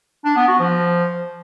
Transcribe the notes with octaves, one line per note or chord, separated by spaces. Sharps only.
D4
B3
F#4
F3